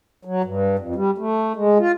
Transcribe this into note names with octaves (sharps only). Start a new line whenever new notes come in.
F#3
G2
F2
G3
A3
G#3
F4